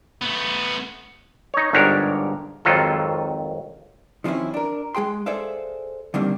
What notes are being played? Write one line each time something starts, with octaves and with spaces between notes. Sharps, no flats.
A3 B3
D#4 C#5
G1 G#2 D4 G4 A#4 C#5
G#1 F2 D#3 F#3 F4 A4
D#3 F3 C4 C#4 E4
D4 A#4
G#3 G#4 G5 C6
G#4 A4 C5 D5 E5 F5
D3 D#3 G3 A#3 C4 D4